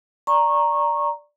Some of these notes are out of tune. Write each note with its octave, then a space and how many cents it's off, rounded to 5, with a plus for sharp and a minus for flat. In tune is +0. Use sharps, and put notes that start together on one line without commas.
D5 +0 A#5 +0 C#6 -20